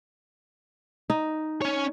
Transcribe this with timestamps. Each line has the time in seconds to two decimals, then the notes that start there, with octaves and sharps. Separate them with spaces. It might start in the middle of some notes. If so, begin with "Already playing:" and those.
1.10 D#4
1.62 C#4 C#5